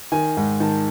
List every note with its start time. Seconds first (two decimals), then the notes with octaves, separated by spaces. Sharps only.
0.12 D#3 G#5
0.37 G#2
0.60 D#3 A5